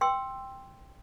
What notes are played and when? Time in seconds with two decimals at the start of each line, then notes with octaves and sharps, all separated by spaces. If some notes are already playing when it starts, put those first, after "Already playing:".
0.01 G5 C6 E6